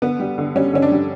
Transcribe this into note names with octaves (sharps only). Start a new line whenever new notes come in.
D3 B3
G3
D3
G3 C#4
D3 C#4
D4
G3